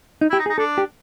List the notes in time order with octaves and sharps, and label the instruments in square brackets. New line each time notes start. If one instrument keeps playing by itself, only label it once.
[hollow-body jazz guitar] D#4
[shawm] E4
[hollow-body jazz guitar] G4
[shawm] D#4
[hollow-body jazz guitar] G#4
[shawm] D#4
[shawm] D4 [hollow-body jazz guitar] A4
[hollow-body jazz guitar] G4